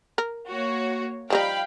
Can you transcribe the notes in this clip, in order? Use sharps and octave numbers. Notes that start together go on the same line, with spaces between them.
A#4
A#3 F#4 C#5
F3 G3 D#4 F5 G5 B5